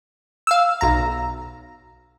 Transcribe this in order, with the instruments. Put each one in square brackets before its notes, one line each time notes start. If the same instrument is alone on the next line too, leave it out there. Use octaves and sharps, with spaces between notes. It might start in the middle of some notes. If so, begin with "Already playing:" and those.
[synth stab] F5 E6
B1 A#5